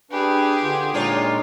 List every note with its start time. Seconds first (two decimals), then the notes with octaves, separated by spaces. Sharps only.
0.11 D4 G4 G#4 B4
0.62 D3 F4
0.94 A#2 G#3 D4 D#4 F4 C#5